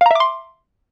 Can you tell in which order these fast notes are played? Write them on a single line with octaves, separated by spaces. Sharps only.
F5 A#5 E5 D6 C6